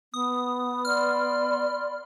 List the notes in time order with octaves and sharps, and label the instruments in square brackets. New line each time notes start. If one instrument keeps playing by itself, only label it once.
[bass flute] B3 [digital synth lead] D#6
[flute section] D5 B5 C6 [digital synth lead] F6